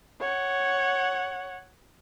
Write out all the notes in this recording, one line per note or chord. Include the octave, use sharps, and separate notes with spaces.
C#5 F#5